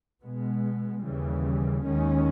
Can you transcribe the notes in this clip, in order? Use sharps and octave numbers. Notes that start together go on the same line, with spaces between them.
B2 G#3 B3
D#2 C#3 E3 G3
D#2 D#3 G#3 C#4